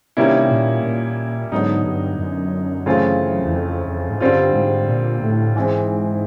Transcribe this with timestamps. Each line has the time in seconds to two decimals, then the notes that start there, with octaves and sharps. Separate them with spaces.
0.17 C3 D#3 G3 A#3 C#4 E4
0.50 A#2
0.84 A#2
1.52 G#2 D3 F#3 B3 D#4
1.85 G2
2.19 F#2
2.86 C#3 E3 A3 C4 F4
3.45 E2
3.54 F2
3.88 F2
4.10 G#2
4.20 G2 D3 G3 C4 F4
4.55 G#2
4.88 A#2
5.22 A2
5.55 G#2 E3 G#3 C4